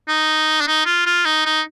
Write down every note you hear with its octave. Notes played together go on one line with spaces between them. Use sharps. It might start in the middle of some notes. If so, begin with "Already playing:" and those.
D#4
D4
D#4
F4
F4
D#4
D#4